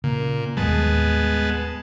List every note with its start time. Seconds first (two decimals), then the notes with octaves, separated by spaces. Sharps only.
0.04 A#2 C#3
0.57 D#2 A2 G3 G#3 B3 A5